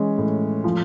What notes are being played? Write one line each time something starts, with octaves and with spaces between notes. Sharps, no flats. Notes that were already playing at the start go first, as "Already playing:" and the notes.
Already playing: E3 G#3 C#4
A2
F3